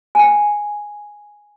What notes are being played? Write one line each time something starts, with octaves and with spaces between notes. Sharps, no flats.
G5 G#5